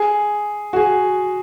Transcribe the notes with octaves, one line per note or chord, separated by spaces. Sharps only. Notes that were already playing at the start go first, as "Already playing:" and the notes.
Already playing: G#4
F#4
G#4